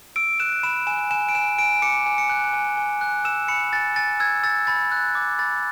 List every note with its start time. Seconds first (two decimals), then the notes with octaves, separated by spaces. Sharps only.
0.16 E6 D7
0.40 F#6 E7
0.63 B5 E7
0.87 G#5 E7
1.11 G#5 E7
1.29 D7
1.35 G#5 E7
1.58 G#5 D7
1.82 D6 C#7
2.06 G#5
2.18 C#7
2.29 F#6
2.53 G#5
2.77 G#5
3.01 F#6
3.25 E6 E7
3.48 B5 C#7
3.73 G#5 A6
3.96 G#5 A6
4.20 E6 G#6
4.43 E6 A6
4.67 B5 A6
4.92 F#6
5.15 D6
5.39 B5 A6